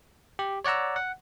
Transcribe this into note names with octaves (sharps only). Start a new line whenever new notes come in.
G4
C#5 D5 F#5 A#5 E6
F#5